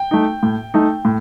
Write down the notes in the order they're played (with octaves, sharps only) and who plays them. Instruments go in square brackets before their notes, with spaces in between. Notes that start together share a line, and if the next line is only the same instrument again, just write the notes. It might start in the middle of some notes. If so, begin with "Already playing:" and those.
Already playing: [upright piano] G5
[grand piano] A3 D#4
A2
A3 D#4
A2